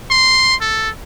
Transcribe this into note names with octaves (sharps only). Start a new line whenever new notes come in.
C6
A4